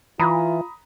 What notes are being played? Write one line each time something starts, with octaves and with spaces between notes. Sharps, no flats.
E3 F4 A#5 B5 D#6